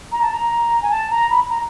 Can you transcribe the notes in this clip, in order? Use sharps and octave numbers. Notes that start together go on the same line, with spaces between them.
A#5
A5
A#5
G#5
A5
A#5
B5
A#5